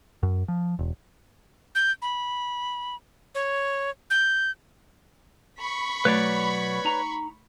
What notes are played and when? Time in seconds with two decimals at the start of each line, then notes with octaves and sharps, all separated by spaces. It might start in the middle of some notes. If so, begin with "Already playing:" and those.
0.23 F#2
0.48 F3
0.79 E1
1.75 G6
2.02 B5
3.35 C#5
4.10 G6
5.60 B5 C#6
6.05 B2 F#3 A3 B4 C#5 D5
6.85 D#4 A#5